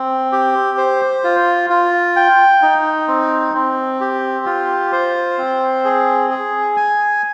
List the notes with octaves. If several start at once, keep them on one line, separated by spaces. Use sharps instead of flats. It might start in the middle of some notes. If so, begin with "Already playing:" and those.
Already playing: C4
G4
C5
F4
F4
G5
D#4
C4
C4
G4
F4
C5
C4
G#4
G#4
G#5